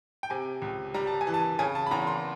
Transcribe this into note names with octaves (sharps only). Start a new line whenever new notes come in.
G5
C3 G#5
C#2
G3 A#5
A5
G#5
E3
A5
C#3 G#5
A5
B5
E2 A#5
C6